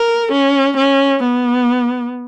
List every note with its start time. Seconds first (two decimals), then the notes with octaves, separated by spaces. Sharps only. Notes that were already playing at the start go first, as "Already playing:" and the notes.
Already playing: A#4
0.32 C#4
0.77 C#4
1.23 B3